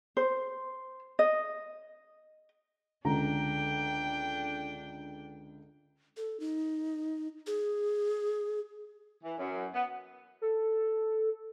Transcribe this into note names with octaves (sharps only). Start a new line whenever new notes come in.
C5
D#5
C#2 D3 D4 G5 A#5
A4
D#4
G#4
E3
F#2
B3
A4